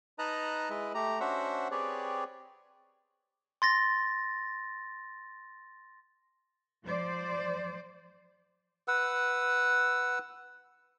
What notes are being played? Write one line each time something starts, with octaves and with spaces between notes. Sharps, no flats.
D#4 B4 D#5 A5 A#5 F#6
G#3 E4 B4 D#5
A3 G4 A#5
C#4 D4 F#4 C5 E5 F#5
C4 G4 G#4 B4 C#5 D5
C6 A6 A#6
F3 C5 D5
B4 F#5 E6